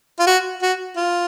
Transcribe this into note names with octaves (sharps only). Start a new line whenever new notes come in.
F4
F#4
F#4
F4